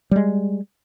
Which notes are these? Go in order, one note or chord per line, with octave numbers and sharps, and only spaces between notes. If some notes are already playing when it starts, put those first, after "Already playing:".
G3 G#3